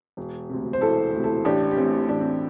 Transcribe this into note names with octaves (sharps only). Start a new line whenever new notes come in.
E1
D2 C3
C5
E1 E4 A4
D2 C3
E4 A4
A1 D4 G4
G4
A2 E3 C4 E4
A1 D4
C4